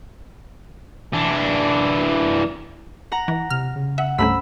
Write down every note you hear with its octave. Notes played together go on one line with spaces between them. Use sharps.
E3 D4
F#5 A#5
E3
C3 F6
C#3
E5 F#5
C2 G2 A3 C#4 C5 A#5 B5 E6